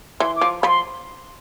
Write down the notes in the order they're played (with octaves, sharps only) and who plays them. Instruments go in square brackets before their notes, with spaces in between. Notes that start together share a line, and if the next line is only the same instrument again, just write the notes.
[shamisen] E3 [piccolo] C6
[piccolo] D6
[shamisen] F3
[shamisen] F3 [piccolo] B5
[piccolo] C6